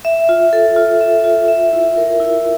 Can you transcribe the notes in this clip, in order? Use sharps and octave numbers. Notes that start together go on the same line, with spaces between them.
E5
F4
A4
F4
E5
F4
E5
E4
A#4
E4